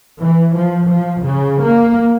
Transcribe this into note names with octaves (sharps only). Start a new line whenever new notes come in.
E3
F3
F3
C#3
A#3